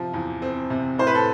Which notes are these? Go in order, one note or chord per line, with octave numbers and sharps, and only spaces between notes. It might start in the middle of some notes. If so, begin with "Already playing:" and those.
Already playing: C3 F3
E2
C4
C3
A2 C5
B4
A4